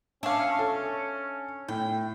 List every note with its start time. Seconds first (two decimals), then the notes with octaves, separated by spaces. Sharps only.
0.23 C#4 D4 E5 F5
0.59 C#4 A4
1.68 A2 G5